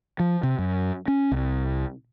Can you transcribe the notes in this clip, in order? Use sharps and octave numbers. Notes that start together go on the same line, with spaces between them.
F3
C3
F#2
C#4
C2